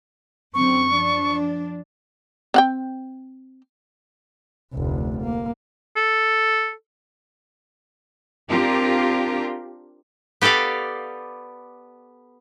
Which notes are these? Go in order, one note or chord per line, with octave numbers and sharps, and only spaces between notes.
F#2 D3 C4 C#6
F3 D4
C4 F#5 G5
F1 D2
A#3
A4
C4 D4 F4 G4 A#4
B3 G4 A4 D5 F5